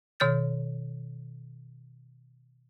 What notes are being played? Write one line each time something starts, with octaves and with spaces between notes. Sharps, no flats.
B2 D#3 C#5 F6 G6 A6